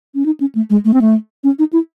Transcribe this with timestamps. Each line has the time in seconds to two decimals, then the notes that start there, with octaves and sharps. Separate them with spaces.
0.15 C#4
0.26 D#4
0.40 C#4
0.55 A3
0.70 G#3
0.85 A3
0.94 C4
1.01 A3
1.44 C#4
1.59 D#4
1.73 E4